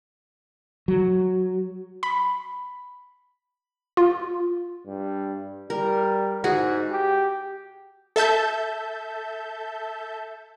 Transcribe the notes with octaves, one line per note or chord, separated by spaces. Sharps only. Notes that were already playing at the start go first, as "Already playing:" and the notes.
F#3
B5
F4
G2
G3 A#4
G#2 F#4 G#4
G4
A4 E5 A5 G6